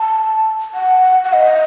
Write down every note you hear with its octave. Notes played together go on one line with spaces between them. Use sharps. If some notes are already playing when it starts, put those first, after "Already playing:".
Already playing: A5
F#5
F#5
D#5